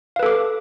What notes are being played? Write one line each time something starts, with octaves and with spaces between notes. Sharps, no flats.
A4 B4 F5 D6